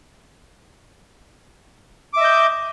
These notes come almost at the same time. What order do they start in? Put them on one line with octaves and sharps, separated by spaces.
D6 E5 D#5 G6